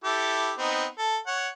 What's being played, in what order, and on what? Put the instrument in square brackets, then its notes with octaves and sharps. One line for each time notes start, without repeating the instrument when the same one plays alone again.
[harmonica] E4 G4 A4
B3 C4 D#4
A4
C#5 F#5